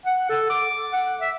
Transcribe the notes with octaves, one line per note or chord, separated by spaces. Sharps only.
F#5
A4
D6
F#5
E5